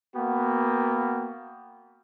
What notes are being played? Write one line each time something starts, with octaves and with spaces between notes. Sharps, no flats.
A#3 B3 F#4 G5